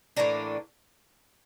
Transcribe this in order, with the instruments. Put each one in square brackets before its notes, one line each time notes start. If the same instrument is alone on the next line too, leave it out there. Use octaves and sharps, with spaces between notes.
[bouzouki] A2 E3 A#3 D4 A#5